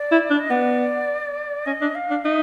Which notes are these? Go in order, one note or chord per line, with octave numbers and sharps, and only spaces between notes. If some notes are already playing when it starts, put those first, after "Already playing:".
Already playing: D5
E4
D4
D#5
B3 D5
C#4 D#5
D4
F5
D4
D#4 E5